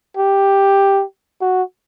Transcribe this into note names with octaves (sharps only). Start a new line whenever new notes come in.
G4
F#4